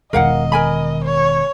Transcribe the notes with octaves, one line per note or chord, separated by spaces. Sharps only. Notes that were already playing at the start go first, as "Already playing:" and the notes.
E1 D#3 A#4 D#5 F5 F#5
A#4 G#5 B5
C#5